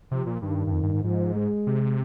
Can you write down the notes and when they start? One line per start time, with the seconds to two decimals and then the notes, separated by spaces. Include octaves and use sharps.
0.11 C3 F3
0.27 A#2
0.42 G2 D#3
0.67 G2
0.72 F2
0.83 G2
0.94 G#2
1.04 G#2 F3
1.35 G#3
1.67 C3